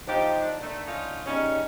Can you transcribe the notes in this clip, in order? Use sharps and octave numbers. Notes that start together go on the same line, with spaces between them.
F3 D4 D#4 F4 G4
D4
D3 D#3 A3
C#4 D#4 F4
C#3 G3 C#4 D#4